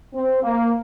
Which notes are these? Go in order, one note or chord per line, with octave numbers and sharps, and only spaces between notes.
C4
A#3